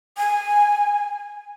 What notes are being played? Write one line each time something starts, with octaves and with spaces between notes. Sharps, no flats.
G#5